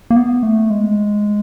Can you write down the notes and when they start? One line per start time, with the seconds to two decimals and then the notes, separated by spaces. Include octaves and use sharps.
0.10 A#3
0.16 B3
0.43 A3
0.70 G#3